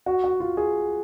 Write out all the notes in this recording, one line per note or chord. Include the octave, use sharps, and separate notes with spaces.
F#4
F#4
F4
G#4